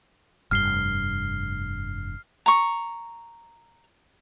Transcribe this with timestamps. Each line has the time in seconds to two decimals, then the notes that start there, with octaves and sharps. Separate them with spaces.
0.51 F1 G2 F6 C7 G7
2.46 A#5 C#6